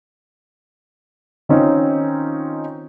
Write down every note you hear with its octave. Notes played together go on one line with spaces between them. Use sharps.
D#3 C4 C#4 D#4 F4